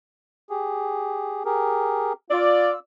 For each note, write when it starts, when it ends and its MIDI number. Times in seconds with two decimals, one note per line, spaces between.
0.50 1.43 67
0.50 1.43 68
1.45 2.13 67
1.45 2.13 68
1.45 2.13 70
2.31 2.70 65
2.31 2.70 74
2.31 2.79 88